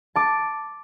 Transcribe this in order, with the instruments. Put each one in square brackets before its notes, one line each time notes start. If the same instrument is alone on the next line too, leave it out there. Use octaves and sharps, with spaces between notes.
[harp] A5 D6